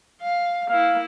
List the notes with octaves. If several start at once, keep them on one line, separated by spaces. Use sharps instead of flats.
F5
A#3 E4 F5